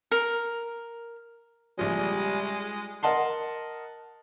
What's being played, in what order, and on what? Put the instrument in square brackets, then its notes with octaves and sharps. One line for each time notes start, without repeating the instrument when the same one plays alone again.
[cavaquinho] A#4
[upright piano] A#1 C#3 F3 [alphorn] G3 [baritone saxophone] G#3
[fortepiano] A#4 D#5 F#5 A5 C6